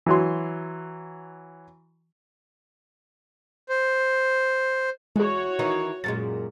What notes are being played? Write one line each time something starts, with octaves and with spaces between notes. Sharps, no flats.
E3 F#3 C6
C5
E2 G#3 F#4 G#4 C#5
D#3 E3 D#4
F#2 A#2 G#3 A6